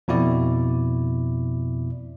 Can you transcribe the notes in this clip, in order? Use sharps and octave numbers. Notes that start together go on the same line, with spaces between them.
F2 B2 E4 D5